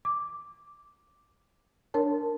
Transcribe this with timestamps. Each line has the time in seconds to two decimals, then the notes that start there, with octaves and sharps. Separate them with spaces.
0.05 D6
1.94 D4 A#4 C#5 A5